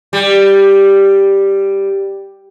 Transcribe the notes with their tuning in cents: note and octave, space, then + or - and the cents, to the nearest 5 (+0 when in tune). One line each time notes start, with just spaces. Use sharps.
G3 +0